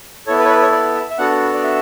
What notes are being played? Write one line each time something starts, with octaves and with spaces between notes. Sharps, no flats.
B3 E4 A4 C#5
B4
C#5
B4
C#5
D5
E5
E5
B3 D4 F#4 A4 F#5
D5
E5